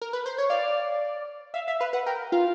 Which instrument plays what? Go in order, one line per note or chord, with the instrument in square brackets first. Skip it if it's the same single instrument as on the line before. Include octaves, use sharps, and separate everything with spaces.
[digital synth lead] A#4
B4
C5
C#5
[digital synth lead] D5 [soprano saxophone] F5
[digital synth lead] E5 [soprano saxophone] F5
[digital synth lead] E5 [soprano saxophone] F5
[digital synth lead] B4 [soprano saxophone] F5
[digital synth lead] B4 [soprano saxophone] F#5
[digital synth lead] A#4 [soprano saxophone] G5
[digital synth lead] F4 [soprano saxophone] F5